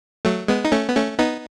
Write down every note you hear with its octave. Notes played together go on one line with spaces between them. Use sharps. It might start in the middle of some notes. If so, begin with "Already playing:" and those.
F#3 A3
G#3 B3
D#4
A3 C#4
B3
A3 C#4
B3 D#4